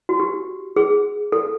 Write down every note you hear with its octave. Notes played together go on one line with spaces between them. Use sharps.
F#4
G4
G#4
A4